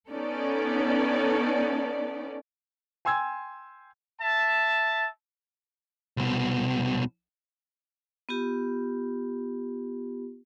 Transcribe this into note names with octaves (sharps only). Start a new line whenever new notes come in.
B3 C#4 D#4 A4 D5
G5 G#5 C6 E6 G#6
E5 A5
C2 B2
B3 F4 G4